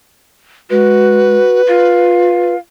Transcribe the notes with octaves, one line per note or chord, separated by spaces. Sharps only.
G#3 F#4 B4
F4 F5